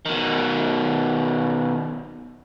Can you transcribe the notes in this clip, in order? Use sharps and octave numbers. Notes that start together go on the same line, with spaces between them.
B2 D#3